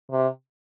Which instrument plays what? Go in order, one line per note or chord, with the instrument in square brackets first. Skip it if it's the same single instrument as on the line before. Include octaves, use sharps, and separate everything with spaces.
[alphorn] C3